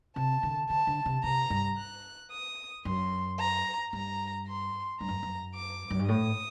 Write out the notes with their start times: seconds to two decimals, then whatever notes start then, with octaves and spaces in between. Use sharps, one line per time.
0.16 C3 A5
0.43 D3
0.70 D3 A5
0.87 D3
1.06 C3
1.23 C3 A#5
1.50 G2
1.77 F#6
2.31 D#6
2.85 F#2 C6
3.39 A#5
3.93 G2 A#5
4.47 C6
5.00 G2 A#5
5.08 F#2
5.23 F#2
5.55 D6
5.90 F#2
5.99 G2
6.09 A2 D#6